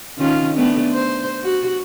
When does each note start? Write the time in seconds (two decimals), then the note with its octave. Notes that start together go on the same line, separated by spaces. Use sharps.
0.19 D#3 C#4 F4
0.56 A3 B3 D4
0.93 C5
1.43 F#4